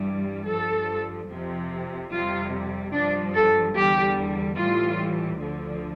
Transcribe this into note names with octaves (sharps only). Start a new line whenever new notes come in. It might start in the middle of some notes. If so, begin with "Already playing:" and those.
Already playing: G2 E3 G3
G2 F3 A4
F2 C3 F3
F2 C3 G3 F4
G2 F3 D4
A4
E2 D3 G3 G4
A2 E3 G3 F4
D2 D3 F3